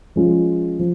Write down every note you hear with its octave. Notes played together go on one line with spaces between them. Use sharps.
F3 G#3 C#4 F4
F3